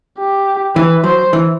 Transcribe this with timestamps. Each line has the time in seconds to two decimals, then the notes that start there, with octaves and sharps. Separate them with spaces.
0.19 G4
0.76 E3 B4
1.03 F#3 C5
1.33 E3